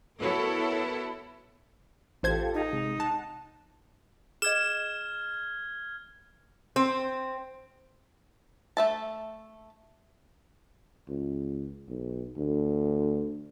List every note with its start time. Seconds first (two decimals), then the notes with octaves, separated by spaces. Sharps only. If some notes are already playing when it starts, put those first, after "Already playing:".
0.20 B3 E4 F#4 A4 A#4 C#5
2.23 A1 F4 G4 A4 C5 G#6
2.54 D#4
2.73 C3 G#3
3.00 F#5 A5
4.42 G#4 D#5 F6 G#6 E7
6.76 C4
8.77 A3 E5 A5
11.09 C#2
11.89 B1
12.38 D2